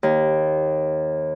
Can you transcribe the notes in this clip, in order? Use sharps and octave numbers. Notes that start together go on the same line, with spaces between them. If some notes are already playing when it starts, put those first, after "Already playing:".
D#2